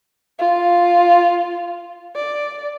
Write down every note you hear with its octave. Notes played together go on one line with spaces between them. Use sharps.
F4
D5